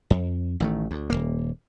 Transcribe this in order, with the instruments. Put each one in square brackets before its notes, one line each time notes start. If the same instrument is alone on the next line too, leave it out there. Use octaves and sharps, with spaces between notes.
[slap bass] F2
A1 D#3 A3
D2
D#1 C#2 A#3